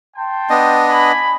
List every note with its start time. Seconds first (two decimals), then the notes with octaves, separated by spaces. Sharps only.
0.16 G5 A5 C6
0.50 B3 D4 D#5
0.87 G#5 B5